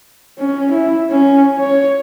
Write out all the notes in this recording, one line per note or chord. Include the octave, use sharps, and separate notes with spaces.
C#4
E4
C#4
C#5